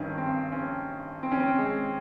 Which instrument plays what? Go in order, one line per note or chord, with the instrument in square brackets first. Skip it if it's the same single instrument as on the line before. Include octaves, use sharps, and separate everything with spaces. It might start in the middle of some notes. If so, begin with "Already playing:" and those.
Already playing: [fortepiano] G#1 G2 D#3 C#4
C4
C#4
C4
C#4
C4
G#3